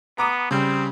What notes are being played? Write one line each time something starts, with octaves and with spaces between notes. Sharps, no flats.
B3 A#5 D6 D#6
C#3 G3 C4